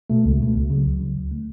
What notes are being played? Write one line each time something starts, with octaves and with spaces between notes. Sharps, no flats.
B2 A3
C#2
B2 A3
C#2
C#3
F#3
C#2
C#3 F#3
D2
D3 A3